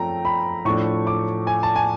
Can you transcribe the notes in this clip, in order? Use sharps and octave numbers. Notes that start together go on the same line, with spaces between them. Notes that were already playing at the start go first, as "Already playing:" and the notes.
Already playing: F#2 F3 A3 C4 G5 A#5
B5
A2 F3 A3 D4 C#6
D6
G#5
A5
G#5